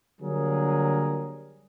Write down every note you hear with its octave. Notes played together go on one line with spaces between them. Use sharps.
D3 F#3 G3 A#3 G#4 A#4